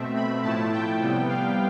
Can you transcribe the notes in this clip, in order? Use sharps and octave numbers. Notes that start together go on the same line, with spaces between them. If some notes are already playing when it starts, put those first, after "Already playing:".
Already playing: B2 A3 C4 E5
B5
A2 F3 A3 E4 A5
G5
C3 G3 B3
F5